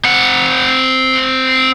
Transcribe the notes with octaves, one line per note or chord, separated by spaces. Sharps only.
C4 F#5